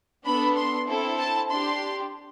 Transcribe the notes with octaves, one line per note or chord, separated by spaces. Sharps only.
B3 D4 A4 B5
C6
C4 E4 A4
A5
D4 G4 C6